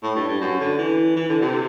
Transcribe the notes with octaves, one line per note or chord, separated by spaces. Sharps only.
A2
G2
G2
F#2
D3
E3
E3
D3
C3